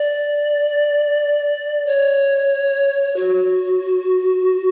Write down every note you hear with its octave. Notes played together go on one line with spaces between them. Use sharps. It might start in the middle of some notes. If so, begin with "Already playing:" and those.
Already playing: D5
C#5
F#4